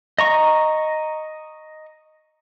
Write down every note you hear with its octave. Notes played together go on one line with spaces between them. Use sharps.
D#5 A#5 C#6